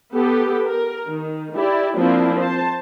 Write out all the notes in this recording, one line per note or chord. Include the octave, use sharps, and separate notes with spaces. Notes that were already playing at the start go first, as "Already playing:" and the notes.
B3 G4 A4
A#4
D#3
E4 G4 D5
F3 A#3 C4 D4 E4
C5 A5